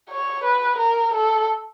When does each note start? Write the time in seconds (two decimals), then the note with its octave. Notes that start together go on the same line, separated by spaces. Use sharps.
0.10 C#5
0.44 B4
0.78 A#4
1.14 A4